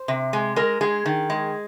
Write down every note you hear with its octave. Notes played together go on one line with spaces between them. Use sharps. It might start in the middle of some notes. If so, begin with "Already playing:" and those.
Already playing: C5
C3
G#3
G#3 A#4
G#3 G#4
D#3
G#3